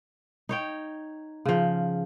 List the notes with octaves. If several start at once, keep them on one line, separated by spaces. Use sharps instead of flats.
D#4 C#5 G5
C#3 F3